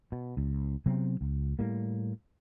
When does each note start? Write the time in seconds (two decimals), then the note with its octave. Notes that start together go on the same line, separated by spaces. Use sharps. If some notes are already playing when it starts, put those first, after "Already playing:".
0.12 B2
0.37 C#2
0.86 C3 F#3 B3 C4
1.21 C#2
1.59 A2 G3 A#3